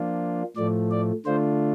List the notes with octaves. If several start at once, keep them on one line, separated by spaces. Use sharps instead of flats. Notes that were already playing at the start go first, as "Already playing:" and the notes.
Already playing: F3 A#3 D4 F4
A2 F3 A3 D5
D5
D3 A3 D4 F4 C5